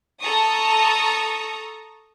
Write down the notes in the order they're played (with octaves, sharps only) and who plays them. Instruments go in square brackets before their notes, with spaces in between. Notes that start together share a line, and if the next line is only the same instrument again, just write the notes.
[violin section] A4 A#5 C#6 D#6